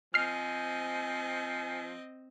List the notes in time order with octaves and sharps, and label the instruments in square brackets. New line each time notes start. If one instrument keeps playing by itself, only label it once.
[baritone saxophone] F3 [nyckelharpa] C4 D#5 [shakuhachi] G#5 [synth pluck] F6 C7